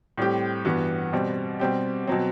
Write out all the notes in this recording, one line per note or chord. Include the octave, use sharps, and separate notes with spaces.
A2 G3 C4 G4
G2 E3 B3 F#4
B2 G3 C4
B2 G3 C4 G4
B2 F#3 C4